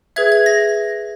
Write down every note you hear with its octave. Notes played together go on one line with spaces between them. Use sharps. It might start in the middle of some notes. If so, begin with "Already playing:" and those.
G#4 B4 E5 G#6
G#6
A#6